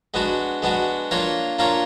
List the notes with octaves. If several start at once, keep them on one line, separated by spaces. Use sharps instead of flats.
G#3 B3 D4 F#4
G#3 B3 D4 F#4
A#3 D4 F4 A#4 C#5
A#3 D4 F4 A#4 C#5